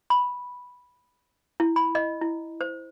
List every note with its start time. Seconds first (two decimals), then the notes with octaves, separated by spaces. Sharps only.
0.10 B5
1.60 E4
1.76 B5
1.95 D#5
2.21 E4
2.61 C5